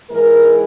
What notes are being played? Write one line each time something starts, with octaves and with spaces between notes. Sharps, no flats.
G#2 E3 G#3 A#4